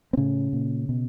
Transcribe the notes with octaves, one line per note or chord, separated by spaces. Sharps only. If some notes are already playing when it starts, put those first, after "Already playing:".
C4
A2 C#3 C#4
A#2
B2